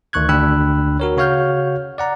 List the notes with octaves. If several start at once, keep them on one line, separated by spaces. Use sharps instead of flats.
D2 D#3 C#6 F#6 G#6
D2 D4 G5 B5 E6 F#6
F#4 A#4 C#5
C#3 F#4 C#5 F5 F6 G6
D5 F#5 A#5